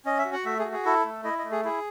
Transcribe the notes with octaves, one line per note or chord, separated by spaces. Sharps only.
C#4 D#5
E5
F#4
F#5
A3 E5
G#4
F#4
G#4
E4 A4
A3
E4 D#5
D#5
A3
G#4
E4 G#4